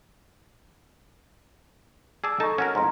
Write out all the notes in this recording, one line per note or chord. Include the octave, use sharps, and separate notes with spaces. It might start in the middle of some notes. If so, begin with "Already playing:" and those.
G#4 D5 A5 E6
D#4 A4 A5 C#6
C#4 F#4 A#4 F#5
F2 G#2 A#5 C6